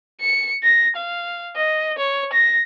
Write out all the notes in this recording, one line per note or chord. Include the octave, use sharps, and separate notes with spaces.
C#7
A#6
F5
D#5
C#5
A#6